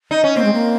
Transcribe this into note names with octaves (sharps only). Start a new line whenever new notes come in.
D#4
C#4
A#3 C4
G#3
A#3